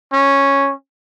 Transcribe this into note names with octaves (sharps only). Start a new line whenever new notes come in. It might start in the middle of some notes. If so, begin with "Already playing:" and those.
C#4